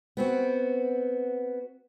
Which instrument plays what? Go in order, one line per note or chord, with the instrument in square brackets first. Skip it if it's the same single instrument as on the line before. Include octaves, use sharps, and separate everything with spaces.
[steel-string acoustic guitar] B3 C4 F#4